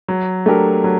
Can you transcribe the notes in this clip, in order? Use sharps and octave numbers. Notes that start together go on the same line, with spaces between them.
F#3
A3 D4 G4 A#4
F#3